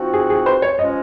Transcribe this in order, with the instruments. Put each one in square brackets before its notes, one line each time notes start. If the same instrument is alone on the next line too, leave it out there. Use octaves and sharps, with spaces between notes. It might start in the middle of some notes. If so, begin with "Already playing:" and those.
Already playing: [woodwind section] F3 C4 D#4 F#4
[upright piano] G#4
G#4
C5
C#5
[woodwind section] F3 G#3 C#4 [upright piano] D#5